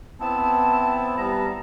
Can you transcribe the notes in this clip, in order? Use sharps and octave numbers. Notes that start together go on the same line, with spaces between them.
B3 C4 E4 A5
G3 B3 A#5